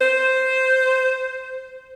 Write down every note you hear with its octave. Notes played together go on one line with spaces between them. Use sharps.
C5